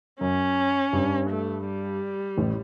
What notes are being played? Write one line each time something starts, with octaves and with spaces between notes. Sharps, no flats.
F#2 C#4
G2
A3
G3
A1 A2